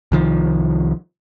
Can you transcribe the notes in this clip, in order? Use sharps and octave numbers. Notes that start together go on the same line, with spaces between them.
C2 D#3 F3